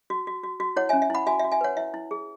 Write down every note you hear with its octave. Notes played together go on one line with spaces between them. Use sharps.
F#4
F#4
F#4
F#4
E4 C#5 F#5
C#4 E5 G#5
E5
E4 F#5 B5
F#4 E5 G#5
E5
F#4
E5 G#5
B4 C#5 F#5
E4 E5
E4
G#4